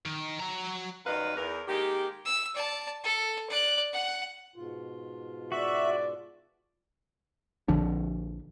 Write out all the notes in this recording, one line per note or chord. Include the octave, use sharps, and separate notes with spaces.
D#3
F#3 A#5
F#2 D#3 G3 B4 D#5 F5
E2 A#4
D#3 G#3 A#3 G4
E6
D5 A5
A4
D5 F#6
F#5
G#2 B2 F4
F#4 D5 E5
A#1 D3 F3 D4